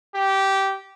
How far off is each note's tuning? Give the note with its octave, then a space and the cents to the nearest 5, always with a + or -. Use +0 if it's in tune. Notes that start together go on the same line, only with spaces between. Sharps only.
G4 -15